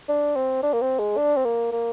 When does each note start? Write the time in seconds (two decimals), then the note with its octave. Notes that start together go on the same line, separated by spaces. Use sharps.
0.09 D4
0.36 C4
0.63 D4
0.73 A#3
0.81 C4
0.99 G#3
1.17 D4
1.37 C4
1.45 A#3
1.72 A#3